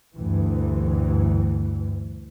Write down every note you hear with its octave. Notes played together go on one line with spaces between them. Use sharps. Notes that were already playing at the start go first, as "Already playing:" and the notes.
D2 G2 E3